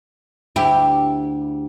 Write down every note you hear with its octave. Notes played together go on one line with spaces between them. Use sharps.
D2 E4 G4